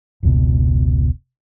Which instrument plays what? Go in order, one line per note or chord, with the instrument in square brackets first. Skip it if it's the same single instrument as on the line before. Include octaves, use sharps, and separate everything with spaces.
[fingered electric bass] F1 C#2 B2